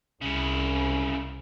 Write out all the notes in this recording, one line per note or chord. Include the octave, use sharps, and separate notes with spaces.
C2 C#3 E4